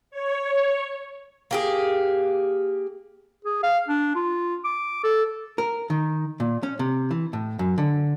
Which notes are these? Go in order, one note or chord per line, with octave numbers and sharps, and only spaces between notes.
C#5
A#3 G4 G#4
G#4
F5
D4
F4
D6
A4
A#4
D#3
A#2
C#4
C3
E3
A2
F#2
D3